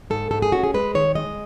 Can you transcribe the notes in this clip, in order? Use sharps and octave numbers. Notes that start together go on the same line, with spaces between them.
G#2 A4
G#2 A4
G#4
C#4 F#4
G#4
G#3 B4
D#3 C#5
G#3 D#5